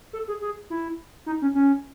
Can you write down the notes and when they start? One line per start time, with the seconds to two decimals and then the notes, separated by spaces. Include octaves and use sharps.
0.13 A4
0.28 G#4
0.41 G#4
0.70 E4
1.26 D#4
1.42 C#4
1.55 C#4